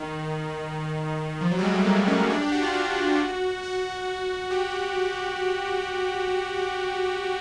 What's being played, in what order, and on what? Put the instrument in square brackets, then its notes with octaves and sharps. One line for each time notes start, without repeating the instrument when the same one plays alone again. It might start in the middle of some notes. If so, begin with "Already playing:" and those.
Already playing: [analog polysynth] D#3
F3
F#3
G3
G#3
A3
A#3
C#4
C#4
D4
G4
F#4
F4
F#4
F#4
G4